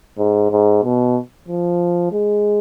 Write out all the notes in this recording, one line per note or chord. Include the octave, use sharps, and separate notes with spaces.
G#2
G#2
B2
F3
G#3